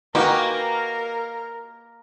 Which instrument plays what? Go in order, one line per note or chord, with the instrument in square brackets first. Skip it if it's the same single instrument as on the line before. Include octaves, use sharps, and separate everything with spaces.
[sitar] A#3 [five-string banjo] D#4 G4 B4 [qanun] F#4 G5 G#5 [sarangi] A#4